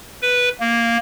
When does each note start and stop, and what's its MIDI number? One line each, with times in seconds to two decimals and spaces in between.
0.22 0.49 71
0.60 0.97 58